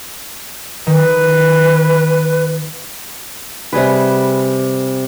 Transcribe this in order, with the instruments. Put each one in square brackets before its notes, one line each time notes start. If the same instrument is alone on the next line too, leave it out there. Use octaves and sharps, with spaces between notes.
[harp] D#3 [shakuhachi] B4
[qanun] C3 G3 G#4 B4